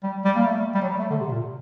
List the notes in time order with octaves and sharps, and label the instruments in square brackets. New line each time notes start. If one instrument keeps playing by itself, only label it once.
[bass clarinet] G3
G3
A#3
A3
G3
G3
F#3
G3
A3
D3
C3
A#2